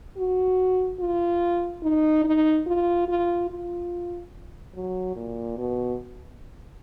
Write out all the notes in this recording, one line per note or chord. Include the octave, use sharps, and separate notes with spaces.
F#4
F4
D#4
D#4
F4
F4
F4
F#3
A#2
B2